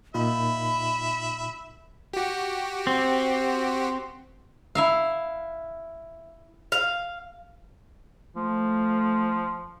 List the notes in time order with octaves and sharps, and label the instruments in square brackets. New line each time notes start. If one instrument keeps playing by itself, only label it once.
[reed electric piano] A#2 D#4 F4 [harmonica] E5 [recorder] B5
[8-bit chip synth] F#4 G4
[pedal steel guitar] C4
[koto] E4 E5 F5
[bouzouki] F5
[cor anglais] F3 [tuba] A3